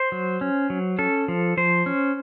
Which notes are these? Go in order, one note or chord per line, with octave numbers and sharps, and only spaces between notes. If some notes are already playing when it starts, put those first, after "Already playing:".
Already playing: C5
F#3
C#4
F#3
C#4 A4
F3
F3 C5
C#4